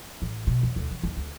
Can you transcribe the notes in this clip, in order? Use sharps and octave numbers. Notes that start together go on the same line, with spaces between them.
A1
B2
E2
D2
E3
D#2
D2